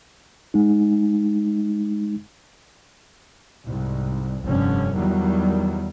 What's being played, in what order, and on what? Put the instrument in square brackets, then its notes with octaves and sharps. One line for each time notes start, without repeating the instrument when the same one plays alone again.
[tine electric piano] G#3 D#4
[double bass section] C2 G#2
F1 G2 D3 C#4
E2 D#3 F#3 G3